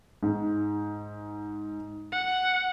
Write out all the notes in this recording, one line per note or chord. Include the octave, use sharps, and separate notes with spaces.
G#2
F#5